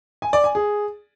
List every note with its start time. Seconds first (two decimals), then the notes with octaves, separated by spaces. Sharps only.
0.22 G#5
0.33 D5
0.44 G#5
0.55 G#4